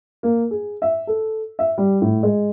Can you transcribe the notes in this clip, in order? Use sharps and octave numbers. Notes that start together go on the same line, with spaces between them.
A#3
G#4
E5
A4
E5
G3
A2
G#3